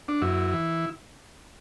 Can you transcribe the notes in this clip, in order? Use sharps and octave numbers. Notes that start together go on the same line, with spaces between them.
D4
F#2 E4
E3